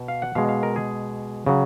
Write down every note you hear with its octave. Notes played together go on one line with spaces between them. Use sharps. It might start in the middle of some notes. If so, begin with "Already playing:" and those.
Already playing: B2
F5
F#5
B2 G#3 F5
F5
A#4
G#4
C#3 F#3